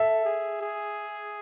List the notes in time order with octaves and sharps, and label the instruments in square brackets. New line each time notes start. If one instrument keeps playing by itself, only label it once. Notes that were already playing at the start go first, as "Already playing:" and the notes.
Already playing: [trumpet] A4 [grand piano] E5
[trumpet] G#4
G#4